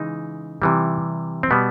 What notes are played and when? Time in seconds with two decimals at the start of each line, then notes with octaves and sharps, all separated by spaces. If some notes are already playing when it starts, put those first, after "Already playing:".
Already playing: C#3 E3 G#3 D#4
0.62 C3 E3 G3
1.43 C4
1.51 B2 G3 B3